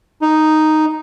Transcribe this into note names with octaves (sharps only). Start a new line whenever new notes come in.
D#4